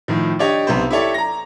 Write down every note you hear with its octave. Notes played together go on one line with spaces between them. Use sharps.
A2 D#3 F3
D4 G4 C#5 D#5
B1 C3 B3 C5
E4 G4 A4 C#5 D5
A#5 A#6